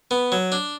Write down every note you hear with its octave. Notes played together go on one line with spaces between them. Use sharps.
B3
F#3
D4